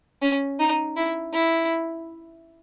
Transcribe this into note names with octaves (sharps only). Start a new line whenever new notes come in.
C#4
D#4
E4
E4